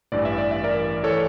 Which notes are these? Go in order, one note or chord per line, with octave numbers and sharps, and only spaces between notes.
A1 G2 E3 D5
E5
D5
E5
A#4 D5
E3 A4 C#5